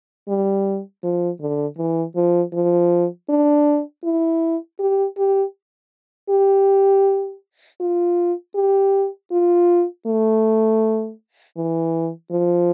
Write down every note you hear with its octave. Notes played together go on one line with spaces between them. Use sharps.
G3
F3
D3
E3
F3
F3
D4
E4
G4
G4
G4
F4
G4
F4
A3
E3
F3